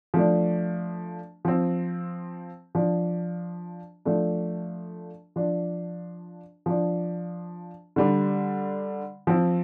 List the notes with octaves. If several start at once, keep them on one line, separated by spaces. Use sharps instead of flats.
F3 A3 D4
F3 C4
F3 D4
F3 A3 D4
F3 D4
F3 D4
D3 G3 D4
F3 C4